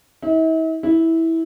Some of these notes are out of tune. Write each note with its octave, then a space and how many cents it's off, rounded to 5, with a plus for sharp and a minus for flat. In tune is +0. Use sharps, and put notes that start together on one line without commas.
E4 -45
E4 -15